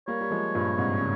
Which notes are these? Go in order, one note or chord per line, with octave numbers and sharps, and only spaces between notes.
G3 A#3 C#5
G3
F3 G#3
G2 A#2
G#2 C3
C#3